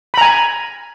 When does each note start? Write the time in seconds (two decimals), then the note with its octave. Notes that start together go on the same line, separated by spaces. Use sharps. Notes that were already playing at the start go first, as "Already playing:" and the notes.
0.14 B5
0.18 A#5
0.21 G#5